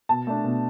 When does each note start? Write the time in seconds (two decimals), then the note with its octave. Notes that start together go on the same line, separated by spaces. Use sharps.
0.09 B2 A5
0.27 A3 D4
0.44 B2